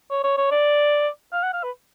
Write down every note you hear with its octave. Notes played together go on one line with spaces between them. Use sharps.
C#5
C#5
C#5
D5
F5
F#5
F5
B4